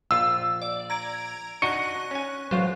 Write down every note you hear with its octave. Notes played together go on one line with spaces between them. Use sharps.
A#1 F4 E6
D5
A#5 G#6 D7
D4 D#4 F#4 C#6 F#6 A#6 C#7 D#7
C#4 G#5
A1 F#3 F4 C5